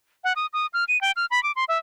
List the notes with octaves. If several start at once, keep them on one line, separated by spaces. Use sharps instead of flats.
F#5
D#6
D#6
F6
D#7
G5
F6
B5
D6
C6
E5